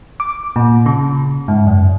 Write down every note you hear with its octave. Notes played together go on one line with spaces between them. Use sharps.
D6
A#2
C#3
G#2
F#2